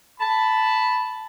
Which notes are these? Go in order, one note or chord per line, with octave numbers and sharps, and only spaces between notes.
A5 B5